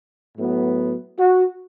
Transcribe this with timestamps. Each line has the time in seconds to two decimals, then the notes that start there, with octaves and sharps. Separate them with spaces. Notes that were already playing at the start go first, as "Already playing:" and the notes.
0.37 A2 F#3 B3
1.18 F#4